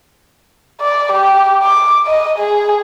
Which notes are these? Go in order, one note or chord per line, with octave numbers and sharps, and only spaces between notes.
D5
G4
D6
D#5
G#4